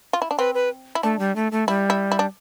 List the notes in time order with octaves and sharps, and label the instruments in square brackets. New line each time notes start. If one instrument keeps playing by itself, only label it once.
[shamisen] F4
E4
D4
[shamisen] C4 [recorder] B4
[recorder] B4
[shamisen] E4
[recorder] A3 [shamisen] D4
[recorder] G3
A3
A3
[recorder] G3 [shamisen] E4
[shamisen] E4
E4
D4